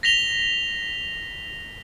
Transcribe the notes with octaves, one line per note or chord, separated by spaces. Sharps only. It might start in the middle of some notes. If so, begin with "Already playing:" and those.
A#6 B6 F7 G7